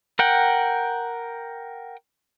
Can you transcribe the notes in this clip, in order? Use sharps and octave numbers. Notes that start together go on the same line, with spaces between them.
A#4 F#5 G5